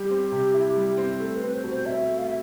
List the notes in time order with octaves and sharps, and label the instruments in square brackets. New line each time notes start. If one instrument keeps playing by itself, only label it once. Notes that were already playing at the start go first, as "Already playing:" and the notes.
Already playing: [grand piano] G3 [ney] G4
[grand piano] C4
C3
E4
G3
C4
[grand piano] A3 [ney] A4
[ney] B4
[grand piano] C4
[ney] C5
[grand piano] B2
[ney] C5
[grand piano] B2 [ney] E5
[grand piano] A3
[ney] F5
E5